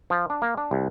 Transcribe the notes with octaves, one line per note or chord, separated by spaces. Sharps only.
F3
D4
A#3
D4
C2